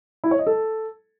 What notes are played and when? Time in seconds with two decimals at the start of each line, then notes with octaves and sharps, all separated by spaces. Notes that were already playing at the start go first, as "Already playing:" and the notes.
0.24 E4
0.31 C#5
0.39 D#5
0.47 A4